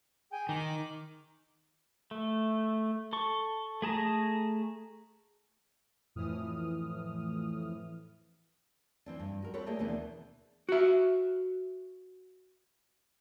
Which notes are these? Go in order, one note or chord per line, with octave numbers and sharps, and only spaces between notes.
G#4 G5 G#5
D#3 D6
A3
A4 C#6
A3 G#4 A5 A#5
F2 A2 E3 D#6 F6
E3 C4 D4
G2
F#4 A#4
C4 A4 B4 C#5
A3 A#3 G#4 C5 D5
D#2 B2 E3 B3 D4 C5
F#4 E5